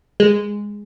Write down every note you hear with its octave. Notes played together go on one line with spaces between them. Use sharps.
G#3